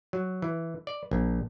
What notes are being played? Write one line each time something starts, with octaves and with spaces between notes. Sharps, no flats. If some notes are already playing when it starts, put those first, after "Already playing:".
F#3
E3
D5
A#1